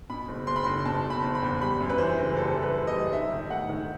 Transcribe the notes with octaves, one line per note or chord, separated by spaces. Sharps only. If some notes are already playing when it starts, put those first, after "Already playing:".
B2 B5
F#1
F#1 C6
B5
F#1 C6
B2 A5
F#1
B5
F#1
B5
E2
G3 B5
F#2
B4
E3 C5
F#1
G3 A4
E3
B4
F#1
D#5
G3
D#4 E5
D#3
A3 F#5
D#3